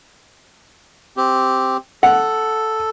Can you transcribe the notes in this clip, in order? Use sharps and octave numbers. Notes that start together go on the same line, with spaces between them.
C4 G4
A4 F#5